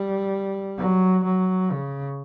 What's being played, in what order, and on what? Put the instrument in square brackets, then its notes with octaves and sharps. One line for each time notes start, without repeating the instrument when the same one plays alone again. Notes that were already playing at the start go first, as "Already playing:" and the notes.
Already playing: [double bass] G3
F#3
F#3
C#3